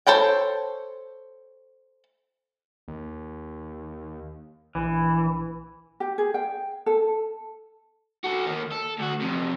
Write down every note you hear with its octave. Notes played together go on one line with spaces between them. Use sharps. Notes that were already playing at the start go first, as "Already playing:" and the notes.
A4 C5 C#5 G5
D#2
A#1 E3
G4
G#4
G5
A4
F#4 A4
D#2 D#3
A4
D2 F#4
F2 C3